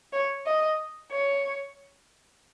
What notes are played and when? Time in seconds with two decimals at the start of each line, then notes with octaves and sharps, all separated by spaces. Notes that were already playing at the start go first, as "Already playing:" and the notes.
0.13 C#5
0.46 D#5
1.11 C#5